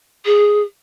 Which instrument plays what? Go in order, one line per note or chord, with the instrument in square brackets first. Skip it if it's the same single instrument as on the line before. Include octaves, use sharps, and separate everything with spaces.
[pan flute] G#4